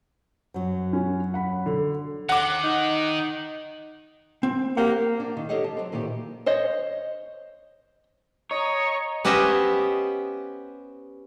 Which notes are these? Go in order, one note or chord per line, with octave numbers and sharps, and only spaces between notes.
F#2 F#3
C#4
F#5 B5
D3
D#3 F#5 D6
D#4
C4
A#3 G4 C5 F#5
D4
D#3
G4 A4 C#5 D#5 F5 F#5
A5
F#3 C4
A#2 D#3 E3 B3 G4
C5 C#5 D#5
C#5 D#5 A#5
B3 C#4 G4 C5 D#5 E5